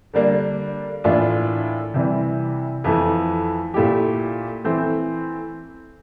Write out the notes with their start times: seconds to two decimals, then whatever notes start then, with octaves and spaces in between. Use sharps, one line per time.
0.13 D3 G3 A#3 D4
1.04 A2 E3 A#3 D4 F4
1.94 C3 E3 G3
2.84 F2 E3 A3
3.74 A#2 A3 E4 G4
4.64 E3 A3 C4